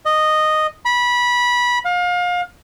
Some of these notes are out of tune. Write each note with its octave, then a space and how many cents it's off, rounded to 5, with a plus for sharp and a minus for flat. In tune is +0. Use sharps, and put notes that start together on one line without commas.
D#5 -10
B5 -20
F5 +30